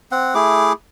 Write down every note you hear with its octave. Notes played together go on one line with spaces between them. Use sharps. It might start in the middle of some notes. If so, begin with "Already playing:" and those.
C4 F#5
A3 E4 G#4 D6